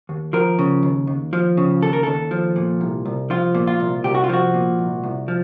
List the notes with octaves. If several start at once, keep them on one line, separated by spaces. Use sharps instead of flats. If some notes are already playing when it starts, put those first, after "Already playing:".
D#2
F3 A#4
C#3
D#2
D#2
F3
C#3
D#2 A4
A#4
D#2 A4
F3
A#2
C2
C2
F3 F4
A#2
F4
C2
C2 G4
F#4
F4
F3 F#4
A#2
C2
C2
F3